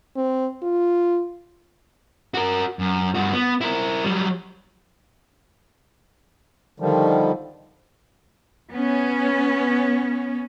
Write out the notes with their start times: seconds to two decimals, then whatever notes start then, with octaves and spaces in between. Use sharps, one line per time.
0.16 C4
0.62 F4
2.34 F#4 A#4
2.79 F#2
3.15 G2 F#4
3.33 B3
3.61 E4 A#4
4.04 F#3 G3
6.80 D3 D#3 F3 G3
8.71 B3 C#4